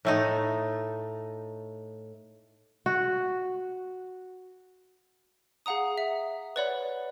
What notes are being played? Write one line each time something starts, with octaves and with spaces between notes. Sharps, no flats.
A2 A3 D#4
F#4
G#4 F5 F#5 A#5 D#6
E5
B4 C#5 D5 F#5 B5